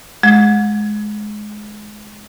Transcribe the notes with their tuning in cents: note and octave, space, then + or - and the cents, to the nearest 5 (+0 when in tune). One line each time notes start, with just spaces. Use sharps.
G#3 +20